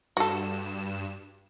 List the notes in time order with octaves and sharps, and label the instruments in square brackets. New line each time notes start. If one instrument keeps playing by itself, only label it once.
[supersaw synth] G2 E7 [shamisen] F#4 A4